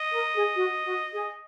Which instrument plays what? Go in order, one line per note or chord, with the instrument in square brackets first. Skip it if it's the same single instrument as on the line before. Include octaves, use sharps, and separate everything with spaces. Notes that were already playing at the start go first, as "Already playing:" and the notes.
Already playing: [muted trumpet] D#5
[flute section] A#4
G#4
F#4
F#4
G#4